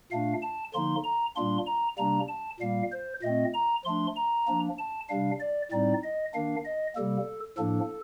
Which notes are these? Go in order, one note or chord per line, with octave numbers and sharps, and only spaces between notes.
A#2 A3 D4 F5
A5
D3 F3 A#3 D#4 C6
A#5
A#2 G3 A#3 D4 C6
A#5
C3 G3 A#3 D4 A#5
A5
A#2 G3 A#3 F5
C5
A#2 A3 C4 D#5
A#5
F3 A3 D4 C6
A#5
F3 A#3 D4
A5
C3 G3 D4 F5
D5
A2 G3 C4 D#4 D5
D#5
D#3 A#3 D4 F5
D#5
C3 G3 A#3 A4
A2 F3 A#3 D4 A4